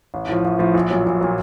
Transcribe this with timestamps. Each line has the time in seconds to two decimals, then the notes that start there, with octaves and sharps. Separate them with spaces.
0.14 A1
0.29 A2 F3
0.44 A1
0.59 A2 F3
0.74 A#1
0.90 A#2 F#3
1.06 A#1
1.21 A#2 F#3